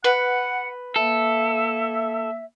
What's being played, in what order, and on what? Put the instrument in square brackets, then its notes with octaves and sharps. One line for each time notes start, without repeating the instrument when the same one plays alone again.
[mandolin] B4 [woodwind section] F#5
[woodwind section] A#3 E5 [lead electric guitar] A4